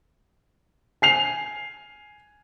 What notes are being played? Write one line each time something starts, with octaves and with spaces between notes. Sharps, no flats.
G#5 C7 F7